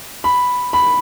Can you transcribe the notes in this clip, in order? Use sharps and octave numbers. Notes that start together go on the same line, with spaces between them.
B5
B5